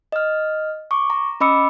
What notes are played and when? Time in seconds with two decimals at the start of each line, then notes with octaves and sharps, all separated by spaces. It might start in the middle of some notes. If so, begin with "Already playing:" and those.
0.12 D#5 F6
0.91 C#6 D6
1.10 A#5
1.41 C#4 D#5 B5 D6 E6 C#7